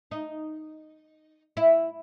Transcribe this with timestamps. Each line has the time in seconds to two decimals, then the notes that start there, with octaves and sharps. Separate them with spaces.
0.11 D#4
1.57 E4